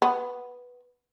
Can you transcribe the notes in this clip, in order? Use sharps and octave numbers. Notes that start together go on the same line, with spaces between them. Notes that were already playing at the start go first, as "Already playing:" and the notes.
B3